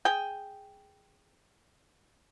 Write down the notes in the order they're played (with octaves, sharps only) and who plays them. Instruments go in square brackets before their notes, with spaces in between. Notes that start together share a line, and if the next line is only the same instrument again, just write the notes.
[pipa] G#4 G5